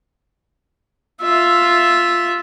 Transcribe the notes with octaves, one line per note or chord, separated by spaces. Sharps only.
F4 E5